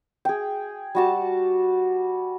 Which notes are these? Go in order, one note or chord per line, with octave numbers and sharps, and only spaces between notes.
G#4 G5
G3 F#4 A5